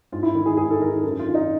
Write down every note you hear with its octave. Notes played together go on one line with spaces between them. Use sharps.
G#2 F4
E4
D#3
G#4
G#2 G#4
A4
D#3 A#4
F#2 A4
F4
D#3
D#4